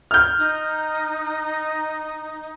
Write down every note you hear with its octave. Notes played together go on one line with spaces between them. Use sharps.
F6 G6
D#4